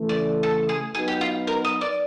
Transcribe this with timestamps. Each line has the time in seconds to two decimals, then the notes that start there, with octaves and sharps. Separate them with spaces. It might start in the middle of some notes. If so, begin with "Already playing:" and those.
Already playing: C#3 E3 A3
0.09 D5
0.43 A4
0.69 G#4
0.95 F#3 B3 D#4 F#4 G#4 B4
1.08 G4
1.21 F4
1.47 A#4
1.64 D#5
1.81 D5